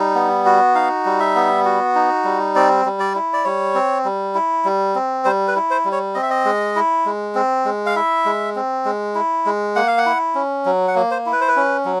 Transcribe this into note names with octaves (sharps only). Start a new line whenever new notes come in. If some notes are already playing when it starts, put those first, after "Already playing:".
Already playing: G3 D#4
B3
F#4
D#4 F5
G3
E5
B3
F#4
D#4
G3
C4 D5
G3
D5
E4
D5
G3 C#5
C4
G3
E4
G3
C4
G3 C5
B4
E4
C5
G3
C#5
C4 D#5
E5
D#5
G#3
E4
G#3
C4
G#3
F5
E4 E5
G#3
C4
G#3
E4
G#3
A#3 F#5
F5
F#5
E4
C#4
F#3
F#5
A#3
C5
E4
B4
C5
B4
C#4
F#3